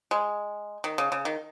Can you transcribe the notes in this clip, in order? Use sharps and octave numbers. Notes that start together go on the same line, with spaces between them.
G#3
D#3
C#3
C#3
D#3